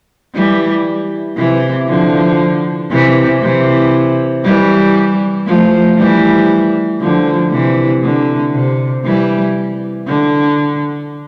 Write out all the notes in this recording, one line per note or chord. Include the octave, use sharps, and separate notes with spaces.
E3 G3
C3 E3
D3 F3
C3 E3
C3 E3
E3 G3
F3 A3
E3 G3
D3 F3
C3 E3
D3
C3
E3 G3
D3